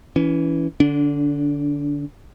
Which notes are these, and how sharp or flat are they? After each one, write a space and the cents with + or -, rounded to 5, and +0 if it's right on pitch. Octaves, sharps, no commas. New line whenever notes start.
E3 +0 C#4 +30
D3 +0 D4 -30